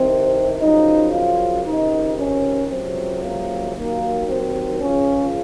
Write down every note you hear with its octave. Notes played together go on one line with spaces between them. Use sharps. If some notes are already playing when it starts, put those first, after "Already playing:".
Already playing: C2 C3 D#3 C4
F#2 C#3 F3 D#4
F4
C#2 C3 D#3 D#4
C#4
C#2 C3 F#3 C4
A#3
D#2 D#3 F#3 A#3
C4
C#2 C#3 F3 C#4